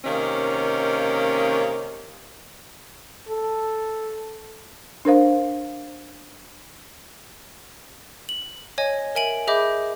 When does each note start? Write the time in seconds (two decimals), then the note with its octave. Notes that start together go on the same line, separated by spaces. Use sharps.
0.04 C3 D#3 A#3 C#4
3.28 A4
5.05 D4 A#4 C5 F5
8.29 F#7
8.78 C#5 D#5 G#5
9.15 A#4 E5 G#5 D7 F#7
9.47 G#4 D#5 E5 B5 D6 G6